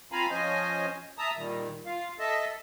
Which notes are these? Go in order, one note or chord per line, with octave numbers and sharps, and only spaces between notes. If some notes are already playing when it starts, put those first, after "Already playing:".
C4 F4 F5 G#5 A#5 B5
F3 C#4 C5 D#5 G#5
E5 A5 A#5 D#6
A#2 D#3 G3
F4 F5
A4 D#5 E5 A5